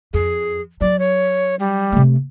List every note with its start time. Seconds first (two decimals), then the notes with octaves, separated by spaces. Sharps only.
0.14 F2 G#4
0.81 F#3 D5
0.99 C#5
1.59 G3
1.92 C3 A3